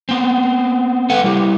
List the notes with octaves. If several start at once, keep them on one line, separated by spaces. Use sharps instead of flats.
B3 C4
A4 B4 F#5
G3 E4 G4